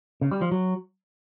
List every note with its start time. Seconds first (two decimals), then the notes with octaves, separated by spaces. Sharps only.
0.21 C#3
0.31 G3
0.41 F3
0.51 F#3